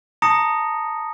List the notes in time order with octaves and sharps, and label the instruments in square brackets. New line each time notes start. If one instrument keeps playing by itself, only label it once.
[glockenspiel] A5 A#5 D#6 A#6 C#7